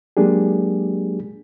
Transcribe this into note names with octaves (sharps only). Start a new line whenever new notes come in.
F#3 G#3 A#3 D4 G4 G#4